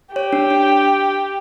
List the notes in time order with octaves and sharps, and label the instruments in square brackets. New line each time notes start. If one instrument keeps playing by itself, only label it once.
[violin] G4 [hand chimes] C#5
[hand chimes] D4
D4